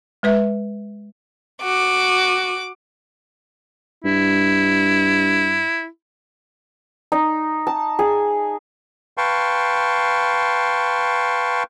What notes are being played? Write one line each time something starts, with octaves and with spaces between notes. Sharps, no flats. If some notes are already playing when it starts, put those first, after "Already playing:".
G#3 B4 E5
F#4 D6
G2 E4
D#4
A5
G#4
B4 F5 G5 A5 C6 C#6